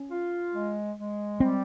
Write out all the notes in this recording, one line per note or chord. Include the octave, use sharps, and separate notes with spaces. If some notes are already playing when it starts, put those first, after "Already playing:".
Already playing: C#4
F4
G#3
G#3
G3 C4